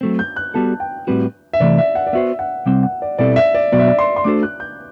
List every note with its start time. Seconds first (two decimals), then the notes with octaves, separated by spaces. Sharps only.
0.01 F#3 A3 C4
0.19 G6
0.36 F#6
0.54 G3 B3 F#4 A4 A5
0.80 G5
1.07 A2 G3 C4 F#4 B4
1.53 E5
1.60 C3 E3 A3 D5
1.78 E5
1.95 F#5
2.07 D5
2.13 B3 F#4 C5 E5
2.39 F#5
2.66 C3 G3 C4 F#5
2.83 F#5
3.02 D5
3.19 B2 G3 C4 E4 A4 D5
3.36 E5
3.55 D5
3.72 B2 F#3 B3 F#4 D5
3.79 E5
3.88 D5
3.99 C6
4.16 C6
4.24 A3 D4 F#4 A4 C5 D6
4.43 F#6
4.60 G6